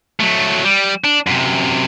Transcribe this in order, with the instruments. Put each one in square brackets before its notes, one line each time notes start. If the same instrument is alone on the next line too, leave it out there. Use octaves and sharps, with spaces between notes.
[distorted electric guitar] F#3 A3
G3
D4
F#2 C3